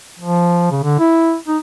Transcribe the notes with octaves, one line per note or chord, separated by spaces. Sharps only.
F3
C#3
D3
E4
D#4